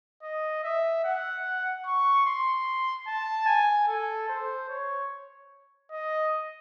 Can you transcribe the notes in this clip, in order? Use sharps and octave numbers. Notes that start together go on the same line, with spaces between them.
D#5
E5
F#5
C#6
C6
A5
G#5
A4
C5
C#5
D#5